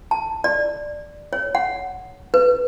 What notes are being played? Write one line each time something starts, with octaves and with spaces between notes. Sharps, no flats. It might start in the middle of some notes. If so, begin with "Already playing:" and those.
A5
D5
C#5
F#5
B4